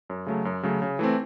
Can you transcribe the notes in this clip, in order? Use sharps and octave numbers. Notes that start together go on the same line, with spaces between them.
F#2
C#3 F#3 A3
F#2
C#3 F#3 A3
C#3
E3 A3 C4